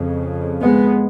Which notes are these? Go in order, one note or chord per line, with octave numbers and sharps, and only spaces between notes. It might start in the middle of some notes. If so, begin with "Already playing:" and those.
Already playing: F2 C#3
G#3 B3